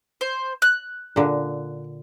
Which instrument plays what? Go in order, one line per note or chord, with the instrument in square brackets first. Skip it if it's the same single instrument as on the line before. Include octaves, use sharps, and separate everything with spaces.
[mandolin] C5
F#6
[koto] A#2 D3